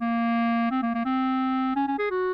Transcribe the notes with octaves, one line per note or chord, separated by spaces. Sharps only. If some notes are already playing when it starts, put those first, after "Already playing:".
A#3
C4
A#3
A#3
C4
C#4
C#4
G#4
F#4